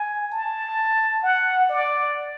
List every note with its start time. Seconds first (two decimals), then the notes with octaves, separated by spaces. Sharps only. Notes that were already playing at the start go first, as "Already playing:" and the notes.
Already playing: G#5
0.32 A5
1.23 F#5
1.69 D5